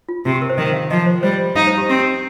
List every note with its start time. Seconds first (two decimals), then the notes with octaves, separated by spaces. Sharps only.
0.09 F4
0.25 C3 F4
0.33 G4
0.42 A#4
0.50 C5
0.58 D#3 D#5
0.74 F5
0.91 F3 D#5
1.06 C5
1.23 G3 C5
1.56 D#4 F5
1.67 C5
1.78 G4
1.88 C4 G4
2.00 G4